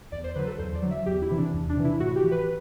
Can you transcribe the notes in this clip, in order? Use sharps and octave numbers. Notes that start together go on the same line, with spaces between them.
E2 D5
C5
D3 F#3 B4
A4
E2 C5
D5
D3 F#3
E5
E2 G4
E4
C3 E3
D4
E2
D4
C3 E3
E4
A2 F#4
G4
E3
B4